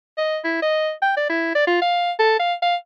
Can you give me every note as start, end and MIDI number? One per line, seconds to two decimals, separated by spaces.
0.18 0.38 75
0.45 0.58 64
0.63 0.91 75
1.02 1.16 79
1.17 1.29 74
1.30 1.54 64
1.55 1.65 74
1.67 1.80 65
1.82 2.12 77
2.19 2.36 69
2.40 2.54 77
2.62 2.76 77